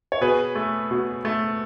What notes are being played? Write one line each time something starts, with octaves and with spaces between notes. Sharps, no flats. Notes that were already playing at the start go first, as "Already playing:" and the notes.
C#5
B2 G#4 B4
A3
B2
A3